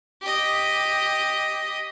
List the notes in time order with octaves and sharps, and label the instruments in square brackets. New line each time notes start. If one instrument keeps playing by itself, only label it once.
[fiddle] G4 D#5